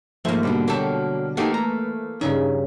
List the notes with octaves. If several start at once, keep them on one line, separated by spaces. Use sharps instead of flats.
G#2 F3 A3 A#3 E5
B2 D3 G3
F#3 A#3 G4 A4 E5
E3 A3 A#3 D#4 G4 F#5
A#5
G2 C#3 C#4 D#4 E5